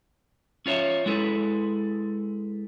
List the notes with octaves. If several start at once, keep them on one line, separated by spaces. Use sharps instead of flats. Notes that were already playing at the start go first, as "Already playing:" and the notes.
C#4 F4 C#5 E5
G#3 E4 A4 B4